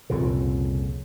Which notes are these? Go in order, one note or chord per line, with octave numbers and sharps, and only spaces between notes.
C2 F2 A#2 C#3